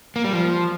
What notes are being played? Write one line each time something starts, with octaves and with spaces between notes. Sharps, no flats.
A#3
G3
F3